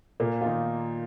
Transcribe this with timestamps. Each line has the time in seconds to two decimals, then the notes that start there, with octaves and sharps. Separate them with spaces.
0.20 A#2 A#3
0.41 F4
0.46 D#3 D#4